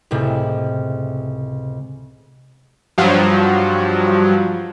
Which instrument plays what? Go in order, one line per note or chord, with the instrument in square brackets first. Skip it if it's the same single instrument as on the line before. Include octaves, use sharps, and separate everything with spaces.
[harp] C#2 A2 C3
[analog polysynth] G2 F3 F#3